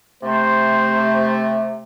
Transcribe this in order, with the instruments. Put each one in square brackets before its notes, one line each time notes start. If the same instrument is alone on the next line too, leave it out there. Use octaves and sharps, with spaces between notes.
[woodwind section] C3 A3 [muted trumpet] C5